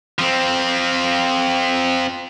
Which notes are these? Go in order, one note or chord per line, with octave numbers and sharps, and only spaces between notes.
F3 C4